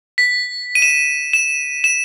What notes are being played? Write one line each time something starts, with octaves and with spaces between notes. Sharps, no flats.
B6
D#7
E7
D#7
E7
E7